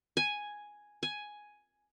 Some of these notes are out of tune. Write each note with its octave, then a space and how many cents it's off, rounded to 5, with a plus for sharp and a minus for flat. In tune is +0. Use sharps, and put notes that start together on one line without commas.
G#5 +0
G#5 +5